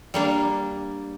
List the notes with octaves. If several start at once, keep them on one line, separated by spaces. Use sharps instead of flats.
G3 A#3 D4